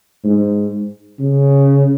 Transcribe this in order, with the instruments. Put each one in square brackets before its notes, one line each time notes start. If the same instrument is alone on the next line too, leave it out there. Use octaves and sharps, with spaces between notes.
[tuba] G#2
C#3